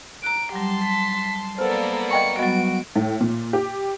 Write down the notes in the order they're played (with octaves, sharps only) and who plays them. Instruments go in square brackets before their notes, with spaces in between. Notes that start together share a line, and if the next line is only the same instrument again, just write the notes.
[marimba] A#5 F#6 [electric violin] D7
[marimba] F#3 G3 [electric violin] G4 [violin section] A5 C6
[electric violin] B6
[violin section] A#3 B3 D5 [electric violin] A4 [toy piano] C5
[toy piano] D#5 G5 C#6 [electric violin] C#7
[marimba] F#3 G3 B3 [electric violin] F#4 [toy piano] D#5 [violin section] D7
[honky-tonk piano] A2
A#2
G4